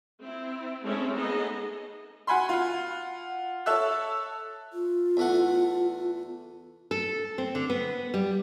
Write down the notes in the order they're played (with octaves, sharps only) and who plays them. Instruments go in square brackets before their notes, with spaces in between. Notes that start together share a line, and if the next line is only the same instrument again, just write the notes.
[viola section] C4 E4
G#3 A3 C4 C#4 E4 A4
A3 B3 D#4 G#4 D#5
[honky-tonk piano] F#4 F#5 G#5 B5 C6
F4 F#5
A4 C#5 E5 A5 E6 F#6
[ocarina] F4
[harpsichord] E2 A3 F#5
[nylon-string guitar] A4
C4
D3
B3
G3